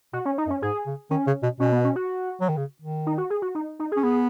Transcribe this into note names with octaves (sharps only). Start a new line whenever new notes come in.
B2 F#4
C#4
D#4
F#2
C#4
G#2 G#4
C#3
D#3 C#4
C#3
B2
B2 C#4
B3
C#4
F#4
F#3
D#3
C#3
D#3
D#4
F#4
G#4
F#4
D#4
D#4
G#4
C#4
B3 G#4